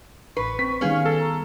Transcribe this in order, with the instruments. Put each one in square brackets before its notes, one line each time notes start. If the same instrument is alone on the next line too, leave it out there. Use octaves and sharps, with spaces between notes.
[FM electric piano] A1 C7 [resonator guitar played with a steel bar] B4 [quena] C#6
[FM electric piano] C4 [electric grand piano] B6
[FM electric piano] D#3 G3 B3 [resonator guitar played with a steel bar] C#4 G#4 [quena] F5
[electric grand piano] A4
[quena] A#5